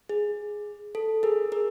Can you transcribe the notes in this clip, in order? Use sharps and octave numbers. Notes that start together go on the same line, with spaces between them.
G#4
A4
G#4 A#4
G#4 A#4